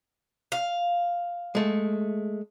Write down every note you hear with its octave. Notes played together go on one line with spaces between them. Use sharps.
F5
G#3 A3